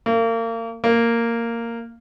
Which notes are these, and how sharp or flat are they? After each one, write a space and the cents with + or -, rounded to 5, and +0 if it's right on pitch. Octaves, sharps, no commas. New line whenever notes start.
A#3 -35
A#3 -10